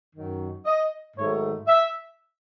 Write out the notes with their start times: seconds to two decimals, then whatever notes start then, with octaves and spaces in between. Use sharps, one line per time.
0.14 F#2 D#3 F#3
0.65 D#5
1.16 G#2 D#3 F#3 A3 C#5
1.67 E5